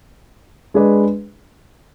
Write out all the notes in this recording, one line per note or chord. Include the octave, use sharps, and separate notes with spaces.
G#3 D4 G#4 B4 D5